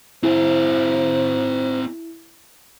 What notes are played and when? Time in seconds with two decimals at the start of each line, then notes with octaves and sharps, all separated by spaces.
0.23 C4 E4 G#4 C5